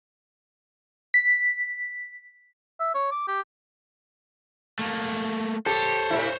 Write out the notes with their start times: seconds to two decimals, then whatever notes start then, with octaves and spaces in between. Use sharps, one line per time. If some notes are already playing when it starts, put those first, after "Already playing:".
1.14 B6
2.80 E5
2.95 C#5
3.12 D6
3.28 G4
4.79 A3 A#3
5.66 G4 A4 C5 C#5
6.11 A2 C3 E4